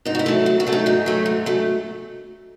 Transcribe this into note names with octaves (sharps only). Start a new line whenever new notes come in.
G#2 D#4
F#4
E4
F#3 A3
G#2 F#4
F#4
F#3 A3
D#4
G#2 D#4
F#3 A3
G#2
F#3 A3